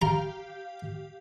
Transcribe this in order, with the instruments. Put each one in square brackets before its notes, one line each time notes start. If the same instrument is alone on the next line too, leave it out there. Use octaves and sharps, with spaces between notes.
[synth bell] G4 F5 [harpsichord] A#5